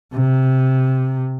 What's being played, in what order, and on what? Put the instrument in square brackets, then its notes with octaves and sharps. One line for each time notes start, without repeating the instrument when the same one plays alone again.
[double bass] C3